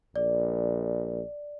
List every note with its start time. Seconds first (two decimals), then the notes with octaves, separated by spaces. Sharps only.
0.16 A#1 D5